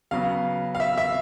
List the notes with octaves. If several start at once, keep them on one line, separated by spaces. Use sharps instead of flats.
C#3 F#3 B3 F5
F5
E5
E5